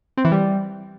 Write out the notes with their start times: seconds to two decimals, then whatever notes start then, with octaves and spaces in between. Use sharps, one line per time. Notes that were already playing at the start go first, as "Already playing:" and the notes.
0.17 C4
0.25 E3
0.32 G3